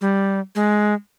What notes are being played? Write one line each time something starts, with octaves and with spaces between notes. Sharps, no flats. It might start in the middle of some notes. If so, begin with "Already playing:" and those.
G3
G#3